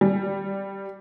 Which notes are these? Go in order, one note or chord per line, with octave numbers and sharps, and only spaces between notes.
G3